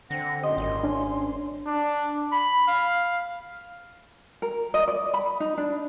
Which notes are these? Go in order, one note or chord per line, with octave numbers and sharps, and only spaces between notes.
D3 C4 F#5 A#6
F#2 A#2 G4 D#5 C6
G#1
C#4 D4 G#5
D4
B5
F5
A#4
D#5
D5
B5
D#4
D4